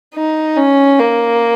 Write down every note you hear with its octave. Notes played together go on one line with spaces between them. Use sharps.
D#4
C#4
A#3